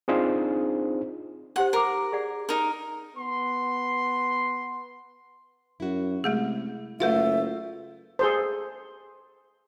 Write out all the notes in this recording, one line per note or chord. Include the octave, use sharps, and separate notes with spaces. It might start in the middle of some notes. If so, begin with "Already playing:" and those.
C4 D4 D#4 F4 G#4 C5
D#4 G4 C5 F#5
A#4 F#5 A#5 D6
G#4 D5 F#5
D#4 A#4
B3 C6
F#2 E4 F#4
C3 G#3 A3 G#4
F#1 A3 F4 F#4 A4 B4 E5 F5
G#4 A4 C5